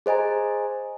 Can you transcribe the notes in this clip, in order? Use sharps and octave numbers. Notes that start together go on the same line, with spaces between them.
G#4 C5 D#5 G#5 A#5